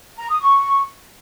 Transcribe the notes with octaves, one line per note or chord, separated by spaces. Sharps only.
A#5
D#6
C#6